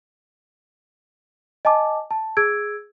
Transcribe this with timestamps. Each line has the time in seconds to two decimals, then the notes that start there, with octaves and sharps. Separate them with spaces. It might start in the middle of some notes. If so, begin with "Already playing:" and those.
1.65 D#5 G#5 A5 D6
2.11 A5
2.37 G#4 E6 G#6 D7